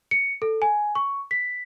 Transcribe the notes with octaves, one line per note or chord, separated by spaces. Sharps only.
C#7
A4
G#5
C#6
B6